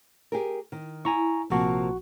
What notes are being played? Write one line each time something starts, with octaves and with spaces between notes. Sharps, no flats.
G4 G#4 A#4
D#3
E4 G#5 A#5 C#6
A#1 C3 F3 A#3 F#4